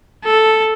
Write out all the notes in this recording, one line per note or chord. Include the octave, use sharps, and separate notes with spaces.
A4